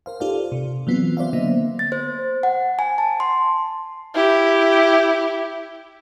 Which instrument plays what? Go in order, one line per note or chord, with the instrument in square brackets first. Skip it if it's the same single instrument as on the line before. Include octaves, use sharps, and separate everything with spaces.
[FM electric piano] A#4 C5 F5
D#4 F4 G4 A4 D5 F5
C3
E3 F#3 B3 C4 F4
F#3 C5 D5 E5 F5
D3 A#3 B3 D#5 E5
[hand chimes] A6
C5
F#5
G#5
A5
C6
[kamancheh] E4 G4